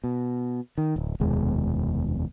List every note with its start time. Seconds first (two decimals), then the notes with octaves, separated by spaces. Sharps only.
0.04 B2
0.78 D#3
0.96 D1
1.20 F1 D#2 B2 G#3